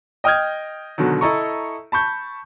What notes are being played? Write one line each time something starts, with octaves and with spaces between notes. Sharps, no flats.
D#5 G5 D#6 F6 G6 G#6
B2 D3 D#3 F#3
E4 A4 D#5 A#5 C#6
A5 B5 C#6 G6